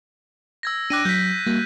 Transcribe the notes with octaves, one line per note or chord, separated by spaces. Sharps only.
E6 G#6 A#6
D4 G5 D6 F#6 A#6 D#7
F#3 G6 B6
G3 A#3 F#4